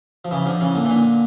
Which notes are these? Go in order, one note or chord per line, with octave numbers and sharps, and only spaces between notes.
F3
C#3 E3
D3 F3
C#3 E3
A#2 D3
E3
A#2 D3